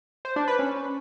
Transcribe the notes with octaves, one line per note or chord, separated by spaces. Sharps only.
C5
D4
B4
C#4